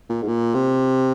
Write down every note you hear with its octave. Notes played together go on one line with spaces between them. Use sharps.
A#2
G#2
A#2
C3